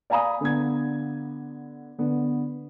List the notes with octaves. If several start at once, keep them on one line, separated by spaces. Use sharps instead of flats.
D5 F5 G#5 A#5 B5 D#6
D3 B3 G#6
D3 B3